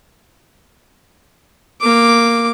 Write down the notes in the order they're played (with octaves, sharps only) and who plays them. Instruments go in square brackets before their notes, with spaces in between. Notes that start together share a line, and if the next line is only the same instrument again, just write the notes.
[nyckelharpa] A#3 D6